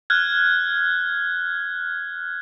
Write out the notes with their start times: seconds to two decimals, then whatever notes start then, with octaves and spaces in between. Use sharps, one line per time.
0.10 F6 F#6 G#6